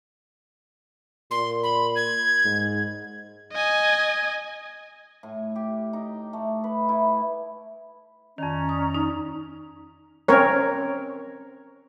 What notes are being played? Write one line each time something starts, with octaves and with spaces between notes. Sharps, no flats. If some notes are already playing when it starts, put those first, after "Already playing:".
A#2 C6
B5
G#6
G#2
D#5 G#5
A2
G4
D#4
A3
B4
E4
F2 D#3 C#4 D5 A#5
D#6
D#4
C4 C#4 A#4 C#5